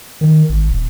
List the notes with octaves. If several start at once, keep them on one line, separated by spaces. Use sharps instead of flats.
D#3
G#1
D#1